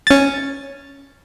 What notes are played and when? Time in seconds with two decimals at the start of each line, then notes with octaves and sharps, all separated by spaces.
0.07 C#4 A6